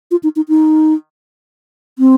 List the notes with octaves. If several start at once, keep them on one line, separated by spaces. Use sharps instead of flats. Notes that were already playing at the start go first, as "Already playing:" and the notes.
F4
D#4
D#4
D#4
C4